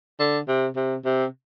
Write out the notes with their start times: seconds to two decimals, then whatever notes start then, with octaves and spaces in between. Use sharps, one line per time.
0.20 D3
0.48 C3
0.76 C3
1.05 C3